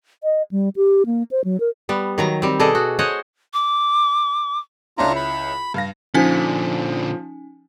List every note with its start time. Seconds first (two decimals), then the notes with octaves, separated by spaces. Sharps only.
0.23 D#5
0.51 G3
0.76 G4
1.06 A#3
1.31 C5
1.44 F#3
1.60 A#4
1.89 G3 B3
2.18 D#3 F#3 A#5
2.42 G3 C4
2.60 B2 G#4 A4 D5 D#5
2.75 F#4
2.99 C5 C#5 D#5 F#5 G#5
3.54 D6
4.98 C#2 C#4 D4 E4 F4 A#5
5.16 B5
5.74 G2 F5 A#6
6.14 A#2 D3 F3 C#4 D#4 G#5